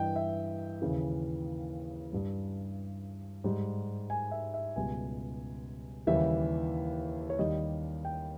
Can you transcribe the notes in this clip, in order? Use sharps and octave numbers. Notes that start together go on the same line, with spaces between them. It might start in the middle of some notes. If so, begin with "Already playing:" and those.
Already playing: G2 E3 D#5 G5
E5
D#2 C#3 E3
G2 G3
G#2 G3
G#5
E5
E5
C#2 B2 G3 G#5
D#2 C#3 E3 G3 E5
C#5
D#2 D#3 G3 D#5
G5